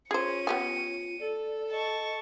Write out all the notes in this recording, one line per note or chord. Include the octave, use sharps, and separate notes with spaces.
C#4 F4 G#4 C5 C#7 D#7
B3 G4 G#5
A4 D5
D#5 A5 C#6